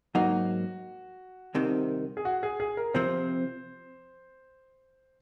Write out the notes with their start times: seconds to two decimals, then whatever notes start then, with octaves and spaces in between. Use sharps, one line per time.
0.15 G#2 F#3 A#3 D#4 F#4
1.55 C2 C3 D#3
2.17 G#4
2.25 F#4
2.43 G#4
2.60 G#4
2.77 A#4
2.94 C3 F3 C4 C5